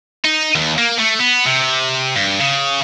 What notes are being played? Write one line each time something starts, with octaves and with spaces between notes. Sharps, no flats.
D#4
D#2
A#3
A3
B3
C3
G2
C#3